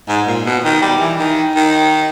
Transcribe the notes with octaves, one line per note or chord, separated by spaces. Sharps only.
G#2
A#2
B2
D#3
G3
E3
D#3
D#3